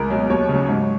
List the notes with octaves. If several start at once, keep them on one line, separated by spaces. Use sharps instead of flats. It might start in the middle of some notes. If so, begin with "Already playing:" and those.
Already playing: C#2 A#4
B2 F#3
D#2 C#5
C#3 F#3
G#2